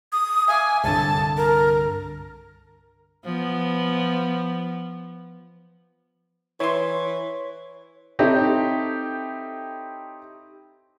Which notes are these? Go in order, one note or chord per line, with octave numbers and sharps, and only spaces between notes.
D#6
E5 F5 G#5 D6
C2 G2 D3 A5
A#4
F3 B3
E3 E4 C#5 C6
C4 D#4 E4 G4 A4 C#5